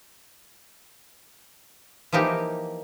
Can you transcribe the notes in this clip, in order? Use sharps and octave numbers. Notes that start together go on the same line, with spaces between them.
E3 F3 A#3 D#4 G4